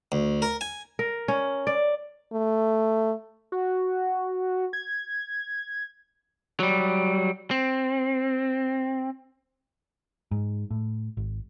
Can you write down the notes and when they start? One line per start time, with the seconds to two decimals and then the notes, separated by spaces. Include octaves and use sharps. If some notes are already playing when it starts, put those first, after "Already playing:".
0.12 D2
0.42 A#4
0.61 G#5
0.99 A#4
1.28 C#4
1.67 D5
2.33 A3
3.52 F#4
4.73 G#6
6.60 F#3 G3
7.51 C4
10.31 G#2
10.71 A2
11.17 G#1